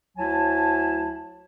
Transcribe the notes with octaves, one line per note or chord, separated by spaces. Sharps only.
D2 F#3 E4 G#5 A5